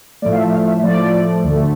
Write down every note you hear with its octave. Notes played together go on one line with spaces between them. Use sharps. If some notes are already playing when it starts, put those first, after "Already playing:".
A2 F3 A3 D5
F5
E5
F5
E5
A2 F3 A3 D5
D2 D3 A3